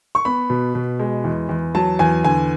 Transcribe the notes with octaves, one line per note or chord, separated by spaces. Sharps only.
C#6
B3 B5
B2
B2
G#3
E2
E2
F#3 A5
E2 G#5
D3 G#5